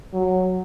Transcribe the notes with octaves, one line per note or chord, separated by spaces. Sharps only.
F#3